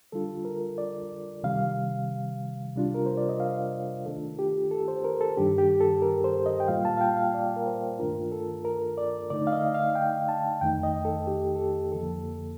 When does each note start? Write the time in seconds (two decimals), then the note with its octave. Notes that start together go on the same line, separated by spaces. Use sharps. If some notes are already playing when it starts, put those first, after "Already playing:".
0.12 D3 G3 D4 F4 A4
0.45 A#4
0.78 D5
1.44 C3 D#3 G3 F5
2.75 C3 G3 D4 F4
2.95 A#4
3.06 C5
3.17 D5
3.29 D#5
3.40 F5
4.06 D#3 A3 D4 F4 A4
4.39 G4
4.71 A4
4.88 C5
5.04 A#4
5.21 A4
5.37 G2 D#3 G3 D4 G4
5.58 G4
5.80 A4
6.02 A#4
6.24 C5
6.46 D#5
6.60 G5
6.68 A#2 G3 A#3 F4 F5
6.85 A5
6.97 F5
7.01 G5
7.17 F5
7.34 D5
7.56 A#4
7.66 C5
7.99 G2 D#3 A3 D4 F4 A#4
8.32 A4
8.65 A#4
8.98 D5
9.30 D3 A3 D#4 D5
9.47 F5
9.52 D#5
9.74 F5
9.95 G5
10.29 A5
10.61 F2 D#3 A3 D#4 G5
10.83 D#5
11.05 A4
11.27 G4
11.56 A4
11.60 G4
11.92 F2 D3 F3 A#3 A4